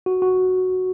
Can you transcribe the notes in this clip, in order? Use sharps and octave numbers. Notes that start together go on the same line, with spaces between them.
F#4
F#4